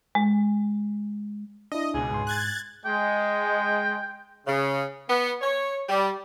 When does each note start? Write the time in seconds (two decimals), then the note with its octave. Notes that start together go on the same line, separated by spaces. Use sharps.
0.15 G#3
1.72 D4 E4 D#5
1.94 C#2 B2 G#4
2.11 G#2 C6
2.27 F#6 G#6 A6
2.85 G#3 G5
4.47 C#3
5.09 B3
5.41 C#5
5.89 G3